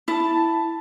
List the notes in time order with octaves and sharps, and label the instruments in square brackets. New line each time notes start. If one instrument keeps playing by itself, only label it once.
[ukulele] E4 [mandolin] A5